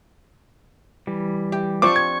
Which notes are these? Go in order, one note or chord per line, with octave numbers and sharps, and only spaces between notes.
E3 G3
G4
F3 C4 D4 C#6 D6
G#6